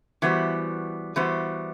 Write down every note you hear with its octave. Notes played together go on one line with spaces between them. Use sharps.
E3 G3 B3 F#4 C5
E3 G3 B3 F#4 C5